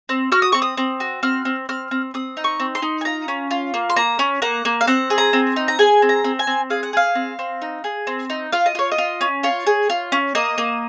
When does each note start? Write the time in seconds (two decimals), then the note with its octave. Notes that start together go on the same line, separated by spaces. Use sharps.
0.09 C4
0.32 F#4 F6
0.42 D#6
0.52 C4 C#6
0.62 D#6
0.77 C4
1.00 F#4
1.23 C4 F6
1.45 C4
1.69 C4 F6
1.91 C4
2.14 C4 D#6
2.37 D#4
2.44 C#6
2.60 C4
2.75 C6
2.82 D#4
3.01 G#5
3.05 F4 A#5
3.28 C#4
3.51 F4
3.74 A#3
3.90 C6
3.96 A#3 A#5
4.19 C#4
4.42 A#3 F#5
4.65 A#3
4.81 F5
4.87 C4 F#5
5.10 G#4
5.18 A#5
5.33 C4
5.56 D#4
5.68 A#5
5.79 G#4 G#5
6.02 C4
6.09 A#5
6.24 C4
6.39 G#5
6.47 C4
6.70 G#4 F5
6.83 F#5
6.93 G#4 F5
7.15 C4
7.39 C4
7.62 D#4
7.84 G#4
8.07 C4
8.30 D#4
8.53 F4 F5
8.66 D#5
8.75 F4 C#5
8.92 D#5
8.98 F4
9.21 C#4
9.43 F4 C#5
9.66 G#4
9.90 F4
10.12 C#4
10.35 A#3 D#5
10.58 A#3